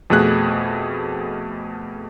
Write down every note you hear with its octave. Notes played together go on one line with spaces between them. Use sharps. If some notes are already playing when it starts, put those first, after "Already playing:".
F2 B2 A3 G#4 F#6